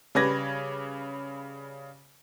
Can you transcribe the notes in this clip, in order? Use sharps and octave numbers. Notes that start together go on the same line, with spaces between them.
C#3 G3 B4 D6 G#6 A#6